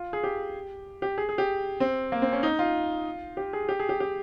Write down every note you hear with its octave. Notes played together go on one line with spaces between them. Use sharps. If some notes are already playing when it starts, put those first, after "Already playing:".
Already playing: F4
G#4
G4
G4
G#4
G#4
G4
C4
A#3
C4
C#4
D#4
F4
G4
G#4
G4
G#4
G4
G4